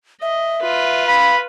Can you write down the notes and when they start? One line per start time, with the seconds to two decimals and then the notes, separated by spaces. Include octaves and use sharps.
0.22 D#5 E5
0.62 F4 B4
1.08 F5 B5